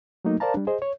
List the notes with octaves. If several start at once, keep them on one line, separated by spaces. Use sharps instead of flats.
F#3 A3 A#3 D#4
A#4 C5 D5 F5 A5 A#5
G3 D4
G#4 C5 D#5
C#5